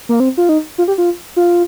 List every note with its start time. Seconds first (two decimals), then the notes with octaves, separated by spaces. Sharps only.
0.09 A#3
0.20 C4
0.37 F4
0.49 D#4
0.78 F4
0.88 G4
0.98 F4
1.36 F4